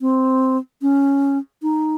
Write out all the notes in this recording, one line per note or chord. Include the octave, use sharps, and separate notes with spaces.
C4
C#4
D#4